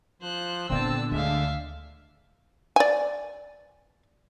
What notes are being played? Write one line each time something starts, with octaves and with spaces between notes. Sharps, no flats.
F3 C5 F#6
A#2 D3 B3 C4 A5 E6
D2 G#3 E5 F5
D5 G#5